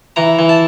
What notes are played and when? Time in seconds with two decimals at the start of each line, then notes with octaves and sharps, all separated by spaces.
0.16 E3 A#5
0.39 E3
0.49 A5